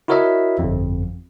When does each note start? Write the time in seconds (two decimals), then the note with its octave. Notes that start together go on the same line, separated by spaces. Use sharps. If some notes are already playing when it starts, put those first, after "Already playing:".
0.08 E4 F#4 A#4 C#5 D#5 E5
0.59 G1 F2